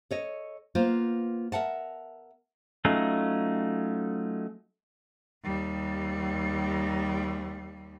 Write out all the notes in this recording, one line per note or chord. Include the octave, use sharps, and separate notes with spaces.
A4 C#5 D#5
A#3 B3 F4 C5
A#4 E5 F#5 A5
F#3 A3 C#4 D#4 F4
D#2 G3